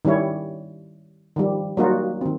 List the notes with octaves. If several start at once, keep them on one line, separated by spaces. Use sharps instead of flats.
D#3 G3 C#4 E4 C#5
D#3 F3 G3
F#3 G3 A#3 D#4 F4 F#4
D#3 C4